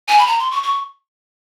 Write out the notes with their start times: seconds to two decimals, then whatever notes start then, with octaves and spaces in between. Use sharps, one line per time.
0.08 G#5
0.18 B5
0.27 A#5
0.39 C6
0.51 C#6
0.63 C#6